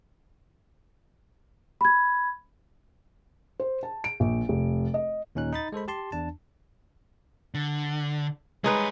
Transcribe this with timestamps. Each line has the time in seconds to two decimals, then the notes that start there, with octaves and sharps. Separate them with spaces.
1.81 B5 G#6
3.60 C5
3.83 A5
4.04 D7
4.20 A#1
4.49 F1
4.94 D#5
5.35 D#2 A#2 C#4 D#4 F#6
5.53 D#4 B5 A6
5.72 G#3 A4 C5 B5
5.88 G4 A5 C6
6.12 E2 D4 A5
7.54 D3
8.64 G3 G#3 D#4 B4 C#5